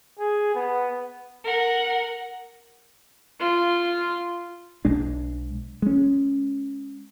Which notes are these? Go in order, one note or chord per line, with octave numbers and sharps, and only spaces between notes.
G#4
B3
A#4 F#5
F4
B1 G#3 D4
G#3 C#4